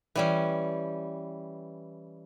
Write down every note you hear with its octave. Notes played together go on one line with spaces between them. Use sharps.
E3 G3 C#4